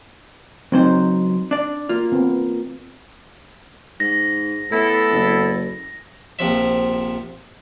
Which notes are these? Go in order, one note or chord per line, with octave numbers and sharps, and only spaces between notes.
C#2 F#3 C4 D#4 C5
D4 D5
A#3 F4
B3 C4
G#2 A#6
A2 B3 E4 A4
F#1
A#1 C3 F3 E5